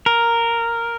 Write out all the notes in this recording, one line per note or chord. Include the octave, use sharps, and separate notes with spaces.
A#4